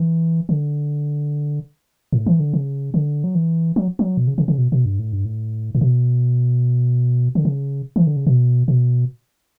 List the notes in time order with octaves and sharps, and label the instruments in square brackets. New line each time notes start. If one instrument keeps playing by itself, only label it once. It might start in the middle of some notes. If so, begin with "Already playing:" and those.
Already playing: [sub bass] E3
D3
A2
E3
D3
C#3
D3
F#3
E3
F#3
F#3
B2
C#3
C#3
C#3
B2
B2
G2
A2
G2
A2
A2
B2
D3
C#3
E3
D3
C#3
B2
B2